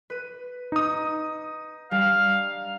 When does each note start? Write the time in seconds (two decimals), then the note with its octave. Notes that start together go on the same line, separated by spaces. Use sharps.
0.10 B4 D#7
0.72 D#4 D#6
1.91 G3 D4 F5